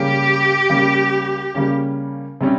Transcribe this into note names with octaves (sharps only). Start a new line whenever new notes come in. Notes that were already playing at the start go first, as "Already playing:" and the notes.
Already playing: C#3 G3 A#3 C#4 G4
C#3 G3 A#3 C#4
C#3 G3 A#3 C#4
C3 G3 C#4